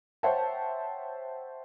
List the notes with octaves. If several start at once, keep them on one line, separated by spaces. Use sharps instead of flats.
C5 C#5 E5 F#5 G5 A5